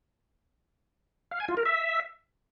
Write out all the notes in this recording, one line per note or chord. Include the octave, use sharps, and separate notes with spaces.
F5
G#5
F4
A#4
E5